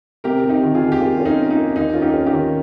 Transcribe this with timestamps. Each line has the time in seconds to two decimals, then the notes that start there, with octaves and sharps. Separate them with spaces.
0.24 C3 G4 A#4
0.44 C3
0.49 D#4 G4
0.63 D#3
0.75 F4 G#4
0.82 D#3
0.92 G4
1.00 A#3 F4
1.17 C#4 F4
1.26 D#4
1.39 A#3
1.51 D#4
1.58 A#3
1.76 D#2 D#4
1.93 C#4 F4
2.02 D#4 G4
2.14 C#4
2.26 D#4 G4
2.33 D#3